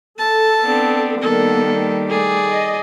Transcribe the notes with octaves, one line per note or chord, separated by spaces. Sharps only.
A4 A5
B3 C4 D4
D#3 G3 A#3 B3 A4
A3 G#4 D5
D#5